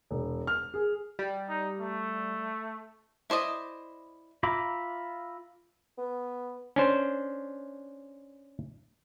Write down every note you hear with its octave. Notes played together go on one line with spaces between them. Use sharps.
E1
F6
G#4
G3
D#4
A3
E4 C5 D5 D#5
F4 E5 A#5 B5 D6
B3
C#4 D4 C5